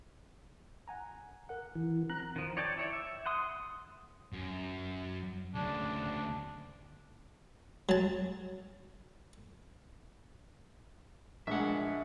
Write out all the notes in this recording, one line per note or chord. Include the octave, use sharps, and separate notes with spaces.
F#5 G#5 A#5
A#4 F#5
E3
C4 A#5 F#6
D#3 F3
C#5 D5 G5 A5
E4 C#5 D5
E5
F#5 C6 D#6
F#2
D2 C#3 D4
F#3 A5
A#1 G#3 E5 F#5